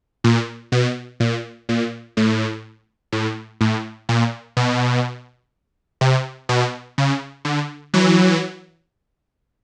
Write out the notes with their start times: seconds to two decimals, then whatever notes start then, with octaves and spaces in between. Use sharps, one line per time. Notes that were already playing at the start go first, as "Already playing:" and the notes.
0.24 A#2
0.72 B2
1.20 A#2
1.69 A#2
2.17 A2
3.12 A2
3.61 A2
4.09 A#2
4.57 B2
6.01 C3
6.49 B2
6.98 C#3
7.45 D3
7.94 E3 F#3